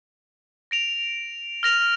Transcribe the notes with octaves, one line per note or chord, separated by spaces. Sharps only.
A#6 D7 F7
F6 A#6 F7